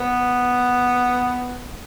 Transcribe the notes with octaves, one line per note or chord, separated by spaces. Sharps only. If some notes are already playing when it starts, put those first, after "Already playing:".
Already playing: B3